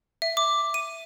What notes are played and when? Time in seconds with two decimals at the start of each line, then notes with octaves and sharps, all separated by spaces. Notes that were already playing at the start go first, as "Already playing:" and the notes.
0.22 E5
0.37 D6
0.74 D#7